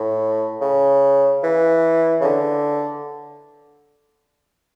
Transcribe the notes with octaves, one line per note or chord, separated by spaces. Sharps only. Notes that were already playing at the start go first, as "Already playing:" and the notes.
Already playing: A2
C#3
E3
C#3
D3